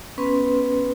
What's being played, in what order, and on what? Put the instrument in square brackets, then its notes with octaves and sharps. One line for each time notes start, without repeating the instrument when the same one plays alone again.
[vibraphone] B3 C#4 B4 C6